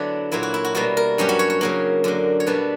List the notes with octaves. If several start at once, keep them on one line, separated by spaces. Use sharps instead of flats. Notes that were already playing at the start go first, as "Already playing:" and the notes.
Already playing: D3 F#3 B3 D4 E4
A#2 F#3 A#3 E4
F#4
E4
F#4
B2 G3 A#3 F#4
A#4
G2 F#3 C#4 G4
F#4
C#5
C#5
C#3 F#3 A#3
F#2 D3 A#3
C#5
B2 G3 B3 D4 B4